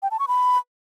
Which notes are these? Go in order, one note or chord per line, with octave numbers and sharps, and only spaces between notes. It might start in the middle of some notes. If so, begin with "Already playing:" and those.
G5
A5
C#6
B5